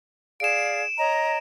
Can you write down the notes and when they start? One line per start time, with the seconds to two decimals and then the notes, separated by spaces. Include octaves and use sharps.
0.40 G#4 D5 F5 D7 E7
0.98 C#5 D#5 A#5